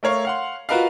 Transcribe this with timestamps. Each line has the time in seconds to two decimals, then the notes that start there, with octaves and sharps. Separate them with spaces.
0.03 A3 A#4 C#5 F5
0.25 F5 F#5 C6
0.69 F4 F#4 A#4 B4 D#5 F5